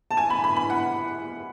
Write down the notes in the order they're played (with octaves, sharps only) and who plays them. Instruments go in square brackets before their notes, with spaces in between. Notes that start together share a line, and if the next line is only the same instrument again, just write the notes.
[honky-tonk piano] A5
G#5
B5
B5
B5
F#5